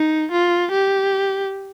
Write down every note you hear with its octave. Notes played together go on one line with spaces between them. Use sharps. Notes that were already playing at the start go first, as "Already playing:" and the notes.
Already playing: D#4
F4
G4